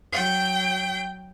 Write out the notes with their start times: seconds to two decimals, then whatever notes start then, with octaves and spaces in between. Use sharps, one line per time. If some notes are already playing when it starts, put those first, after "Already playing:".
0.13 F#3 G5